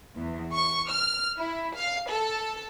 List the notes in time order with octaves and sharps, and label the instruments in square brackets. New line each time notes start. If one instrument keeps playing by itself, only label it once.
[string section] E2
C#6
F6
E4
F5
A4